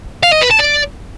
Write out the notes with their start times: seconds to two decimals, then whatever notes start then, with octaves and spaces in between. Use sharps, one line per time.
0.23 F5
0.32 D#5
0.42 B4
0.51 A5
0.60 D5